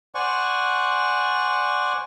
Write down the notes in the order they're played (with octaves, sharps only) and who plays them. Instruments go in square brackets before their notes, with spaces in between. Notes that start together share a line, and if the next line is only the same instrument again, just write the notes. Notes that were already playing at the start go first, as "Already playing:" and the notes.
[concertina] C5 D5 F#5 G#5 C#6